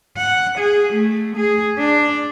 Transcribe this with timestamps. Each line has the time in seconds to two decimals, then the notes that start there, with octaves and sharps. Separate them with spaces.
0.17 F#5
0.58 G#4
0.93 A3
1.37 G#4
1.79 D4